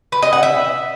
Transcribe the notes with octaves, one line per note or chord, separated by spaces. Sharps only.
B4
D#5
F#5
E5